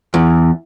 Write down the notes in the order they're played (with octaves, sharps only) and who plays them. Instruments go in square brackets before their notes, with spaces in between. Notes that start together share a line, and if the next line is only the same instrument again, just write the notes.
[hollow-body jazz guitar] E2